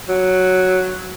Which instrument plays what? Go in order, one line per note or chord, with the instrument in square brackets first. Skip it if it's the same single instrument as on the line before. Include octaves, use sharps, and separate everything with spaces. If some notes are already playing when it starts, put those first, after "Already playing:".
[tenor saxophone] F#3